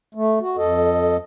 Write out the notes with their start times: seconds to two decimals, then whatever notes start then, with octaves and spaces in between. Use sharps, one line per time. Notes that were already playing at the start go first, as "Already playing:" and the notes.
0.15 A3
0.41 F#4
0.57 F2 A4 D#5